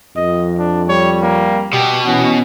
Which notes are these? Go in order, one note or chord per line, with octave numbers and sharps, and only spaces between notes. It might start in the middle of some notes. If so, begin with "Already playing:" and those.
F2 D#5
D4
G3 C#5
A#3
B2 G4
E3 C#4 F#4